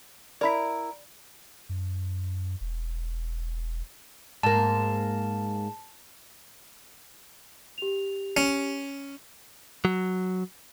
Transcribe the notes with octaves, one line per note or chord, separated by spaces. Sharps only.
E4 A#4 D5 B5 B6
F#2
E1
G#2 A#3 A5
G4 F7
C#4
F#3